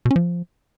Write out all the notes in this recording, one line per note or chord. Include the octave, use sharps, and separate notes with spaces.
B2
C#4
F3